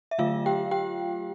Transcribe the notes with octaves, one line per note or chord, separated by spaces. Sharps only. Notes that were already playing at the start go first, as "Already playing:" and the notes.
E5
D3 F#3 A3 F4 F5
G4 G5
G4 G5